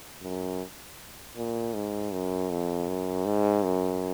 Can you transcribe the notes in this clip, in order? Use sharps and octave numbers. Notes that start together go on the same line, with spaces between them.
F#2
A#2
G#2
F#2
F2
F#2
G#2
F#2